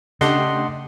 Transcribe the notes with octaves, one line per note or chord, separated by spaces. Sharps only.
C#3 A3 D4 G4 D#5 F#5 C6